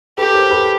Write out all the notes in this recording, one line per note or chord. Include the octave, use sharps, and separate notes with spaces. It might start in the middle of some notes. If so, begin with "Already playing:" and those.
G4 A4 B4
A#4 C5
A4 B4